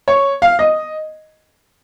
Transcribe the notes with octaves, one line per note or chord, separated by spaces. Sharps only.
C#5
F5
D#5